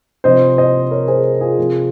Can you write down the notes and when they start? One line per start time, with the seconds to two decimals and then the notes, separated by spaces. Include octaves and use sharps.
0.24 C3 F3 C5 D#5
0.58 C5 D#5
0.91 A#4 C#5
1.07 G#4 C5
1.41 F4 G#4
1.58 C3 F3